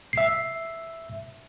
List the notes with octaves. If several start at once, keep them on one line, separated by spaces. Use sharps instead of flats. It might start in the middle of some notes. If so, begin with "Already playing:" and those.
E5 C7